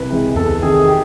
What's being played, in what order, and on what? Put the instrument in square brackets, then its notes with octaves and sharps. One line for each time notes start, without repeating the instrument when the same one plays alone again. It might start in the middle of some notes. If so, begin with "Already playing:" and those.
Already playing: [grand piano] C2 B4
C3 E3 G#3
E2 A4
C3 D#3 G#4
G4